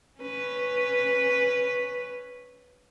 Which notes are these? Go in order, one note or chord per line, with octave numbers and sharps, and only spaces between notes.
C#4 B4